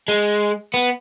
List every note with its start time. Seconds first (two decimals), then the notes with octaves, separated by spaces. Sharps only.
0.08 G#3
0.74 B3